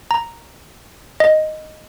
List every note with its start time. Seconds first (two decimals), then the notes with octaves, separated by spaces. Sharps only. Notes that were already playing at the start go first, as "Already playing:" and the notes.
0.11 A#5
1.20 D#5